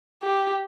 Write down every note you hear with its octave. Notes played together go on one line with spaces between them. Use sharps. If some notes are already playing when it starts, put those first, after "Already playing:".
G4